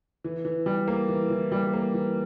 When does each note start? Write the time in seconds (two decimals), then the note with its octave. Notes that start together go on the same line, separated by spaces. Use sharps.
0.24 E3
0.45 E3
0.66 G3
0.88 A#3
1.08 E3
1.30 E3
1.52 G3
1.73 A#3
1.94 E3